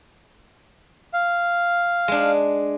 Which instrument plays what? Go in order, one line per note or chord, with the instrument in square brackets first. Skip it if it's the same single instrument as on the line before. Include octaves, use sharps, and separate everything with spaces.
[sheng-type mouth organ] F5
[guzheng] G#3 D4